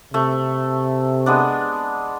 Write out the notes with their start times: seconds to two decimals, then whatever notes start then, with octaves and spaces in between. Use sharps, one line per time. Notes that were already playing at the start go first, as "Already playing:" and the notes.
0.14 C3 A3
1.26 G#3 B3 D4